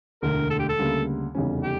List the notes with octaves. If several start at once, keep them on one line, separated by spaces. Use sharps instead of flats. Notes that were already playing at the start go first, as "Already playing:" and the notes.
E1 D2 D3 A3 A#4
A4
G4
A4
D2 C#3 G3 A#3
F1 E2 C#3 G3 C#4
G4